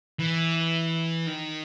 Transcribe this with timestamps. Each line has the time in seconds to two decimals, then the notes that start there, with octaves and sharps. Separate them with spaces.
0.19 E3
1.28 D#3